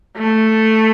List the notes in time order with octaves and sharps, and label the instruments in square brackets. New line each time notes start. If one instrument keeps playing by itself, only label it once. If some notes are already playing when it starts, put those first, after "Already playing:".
[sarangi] A3